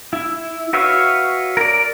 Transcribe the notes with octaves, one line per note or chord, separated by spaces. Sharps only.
E4
F#4 B4 C#5 E5 F5
A#4 D5